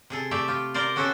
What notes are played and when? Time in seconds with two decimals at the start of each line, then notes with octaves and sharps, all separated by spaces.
0.10 C3 G#4 A4
0.31 A3 G4 D5 E5
0.48 F4 G4
0.74 A#4 C5 D5 F5
0.96 B3 C#4 F#4 A4 C5 E5